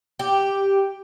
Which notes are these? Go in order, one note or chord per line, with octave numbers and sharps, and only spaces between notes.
G4